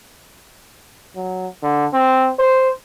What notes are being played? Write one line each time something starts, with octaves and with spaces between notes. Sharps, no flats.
F#3
D3
C4
C5